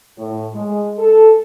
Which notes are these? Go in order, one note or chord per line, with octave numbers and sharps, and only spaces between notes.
A2
G#3
A4